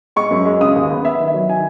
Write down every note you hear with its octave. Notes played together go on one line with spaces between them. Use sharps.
G#3 C#6
F#2
G#3
C#3 D#6
D#2
B3
B3 E5
D#3
E5
F#3
D#3 G#5